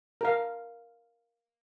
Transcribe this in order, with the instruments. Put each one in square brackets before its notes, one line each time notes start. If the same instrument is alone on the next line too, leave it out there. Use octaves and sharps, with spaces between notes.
[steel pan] A#4 F5